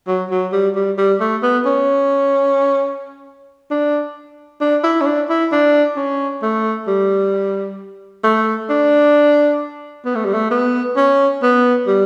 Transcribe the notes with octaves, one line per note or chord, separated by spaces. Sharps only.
F#3
F#3
G3
G3
G3
A3
B3
C#4
D4
D4
E4
C#4
D4
E4
D4
C#4
A3
G3
A3
D4
B3
A3
G3
A3
B3
C#4
B3
G3